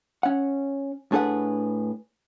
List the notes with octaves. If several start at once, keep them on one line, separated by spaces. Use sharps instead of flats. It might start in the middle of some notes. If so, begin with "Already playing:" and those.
C#4 F#5
A2 D4 G#4 A4 B4 F#5